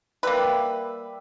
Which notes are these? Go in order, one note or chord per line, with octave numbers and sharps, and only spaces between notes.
G3 A#3 B4 E5 D6